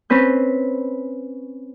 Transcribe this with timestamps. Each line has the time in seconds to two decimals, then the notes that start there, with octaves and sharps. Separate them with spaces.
0.10 C4 C#4 B4 G6